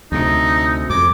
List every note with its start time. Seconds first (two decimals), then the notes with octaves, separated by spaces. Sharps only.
0.12 D2 C3 D#4
0.90 F2 D6